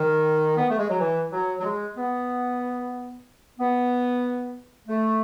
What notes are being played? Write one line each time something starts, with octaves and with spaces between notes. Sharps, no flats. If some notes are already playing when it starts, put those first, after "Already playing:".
Already playing: D#3
B3
A3
G#3
F#3
E3
F#3
F#3
G#3
B3
B3
A3